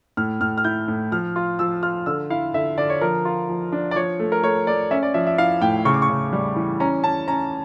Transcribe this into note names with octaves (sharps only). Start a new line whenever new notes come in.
A2 F6
A2 F6
F6
E4 G6
A2
F3 F6
F4
F3 E6
F4 F6
D3 E6
E4 F5
D3 E5
D3 D5
C#5
F3 A#4
F4
F3
D4
D5
F3 C#5
A3
A#4
A3 C#5
A3 D5
C#4 E5
D5
F3 E5
E5
E4 F5
A2 G5
C#3 C#6
D6
C#6
C#3
G3
E3
C#4 A#5
C#4 A5
C#4 A#5